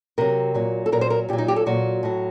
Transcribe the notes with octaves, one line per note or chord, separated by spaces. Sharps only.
C3 F#3 A#4
A#2 F#3
A4
A#2 F#3 A#4
C5
A#4
A#2 F#3 G4
D#4
G4
A4
A#2 F#3 F#4
A2 F#3